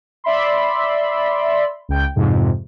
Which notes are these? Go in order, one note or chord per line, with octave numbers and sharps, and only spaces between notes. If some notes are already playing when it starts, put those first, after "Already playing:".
D5 E5 B5 C6
C#2 G5
F2 G#2 C3